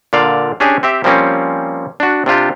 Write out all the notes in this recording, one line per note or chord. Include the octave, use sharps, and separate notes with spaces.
A#2 D3 D5 F5
C#4 D4 G4 G#4
C4 G4 E5
F3 G3 A#3 C4 C#4
D4 F#4
C3 D4 F4 G4